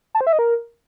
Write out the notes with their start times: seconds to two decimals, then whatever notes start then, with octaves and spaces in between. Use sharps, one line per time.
0.15 A5
0.21 C5
0.27 E5
0.33 D#5
0.39 A#4